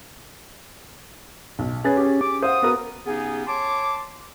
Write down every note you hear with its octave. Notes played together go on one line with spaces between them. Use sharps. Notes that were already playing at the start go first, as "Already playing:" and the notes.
B1
C#4 G#4 B4 A6
G4 G#4
D6
C5 F5 F#5 D#6
B3 F#4 A#4
C#3 B3 C#4 D#4 G4 G#4
C#5 A5 C6 D6